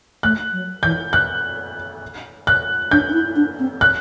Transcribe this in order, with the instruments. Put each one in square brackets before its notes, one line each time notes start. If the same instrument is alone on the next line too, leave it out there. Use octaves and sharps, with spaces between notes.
[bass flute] A3 [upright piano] F#6
[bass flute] F#3
[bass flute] E3 [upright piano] G6
[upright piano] F#6
F#6
[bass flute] D4 [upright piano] G6
[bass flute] D4
E4
D4
C4
[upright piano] F#6